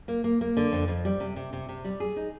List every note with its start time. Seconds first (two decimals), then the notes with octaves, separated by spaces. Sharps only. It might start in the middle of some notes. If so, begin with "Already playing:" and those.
0.08 A#3
0.24 A#3
0.41 A#3
0.57 D3
0.72 F2
0.88 F2
1.05 G3
1.20 C3
1.36 C3
1.53 C3
1.69 C3
1.84 G3
2.00 G#4
2.16 D#4